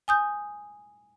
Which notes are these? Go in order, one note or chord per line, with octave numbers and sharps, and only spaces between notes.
G#5 D#6 G6